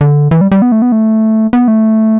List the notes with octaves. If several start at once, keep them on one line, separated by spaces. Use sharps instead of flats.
D3
E3
G3
G3
B3
A3
B3
A3
B3
A3